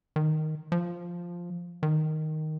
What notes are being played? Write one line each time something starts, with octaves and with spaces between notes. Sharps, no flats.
D#3
F3
D#3